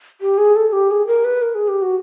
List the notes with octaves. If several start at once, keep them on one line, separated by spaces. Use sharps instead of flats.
G4
G#4
A4
G4
G#4
A#4
B4
A#4
G#4
G4
F#4